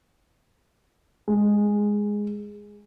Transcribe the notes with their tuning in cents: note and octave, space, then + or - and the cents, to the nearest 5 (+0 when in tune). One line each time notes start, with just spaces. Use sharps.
G#3 -5